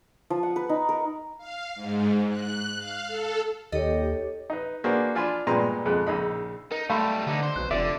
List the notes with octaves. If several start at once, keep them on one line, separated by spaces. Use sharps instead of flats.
F3
F#5
B4
D#4
A#4
F5
G#2
F#6
F5
A4
D#2 G4 A4 C#5 D#5
D#4 B4
A#3 D4 F#4 G#4 B4 C5
D4 F4 G#5 B5 C6
G2 A#2 G#3 B3 A#5 C6
F2 C#3 G#3 F#6
A#1 C#3 D#4 B5
D#4 A#4
B1 G3 A3 F5 B5 C6
D3 B3 D#4
C5
B1 F#6
F1 D3 D5 E5